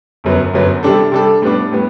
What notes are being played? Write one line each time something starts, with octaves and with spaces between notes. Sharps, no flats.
G1 F#2 F#3 B3
G1 F#2 F#3 B3
C3 G3 D4 A4
C3 G3 D4 A4
A2 G3 B3 D4
A2 G3 B3